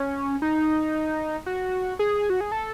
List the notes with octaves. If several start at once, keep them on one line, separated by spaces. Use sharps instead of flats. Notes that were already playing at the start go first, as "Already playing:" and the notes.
Already playing: C#4
D#4
F#4
G#4
F#4
G#4
A4